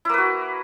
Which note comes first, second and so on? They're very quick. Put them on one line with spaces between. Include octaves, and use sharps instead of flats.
E4 A#3 B4 F#4